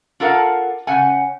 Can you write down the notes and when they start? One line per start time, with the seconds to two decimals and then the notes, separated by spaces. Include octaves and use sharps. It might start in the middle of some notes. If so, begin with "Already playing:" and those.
0.20 D4 F4 A4 A#4 F5 F#5
0.87 C#3 C#4 F#5 G#5